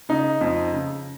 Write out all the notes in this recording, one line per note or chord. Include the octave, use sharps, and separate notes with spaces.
C#3 D#4
F2
C#3